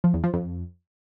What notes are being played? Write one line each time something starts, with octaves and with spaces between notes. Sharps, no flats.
F3
E2
F3
F2